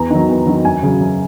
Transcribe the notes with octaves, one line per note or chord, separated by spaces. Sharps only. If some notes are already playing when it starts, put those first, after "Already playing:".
Already playing: E2 A#5
D#3 F#3
E2
D#3 F#3
F#2 G#5
C#3 F#3
F#2